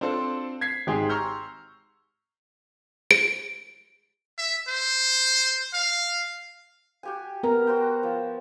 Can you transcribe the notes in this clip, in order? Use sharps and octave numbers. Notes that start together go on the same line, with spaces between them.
C4 D4 F4 A4 C5
G#6 B6 C7
G#1 G#2 G4 G#4 G5 C6
A#5 C6 C#6 E6 F6 G6
D7
E5
C5
F5
F#4 G4 G#5
B3 A#4 A#5
F#4 C5 G5
F3